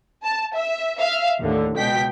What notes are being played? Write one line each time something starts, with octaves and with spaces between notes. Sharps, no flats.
A5
E5
E5 F5
D#2 A2 D3
C#2 B2 G5 B6